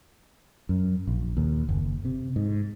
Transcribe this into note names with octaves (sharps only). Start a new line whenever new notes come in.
F#2
A#1
D#2
F#1
C3
G#2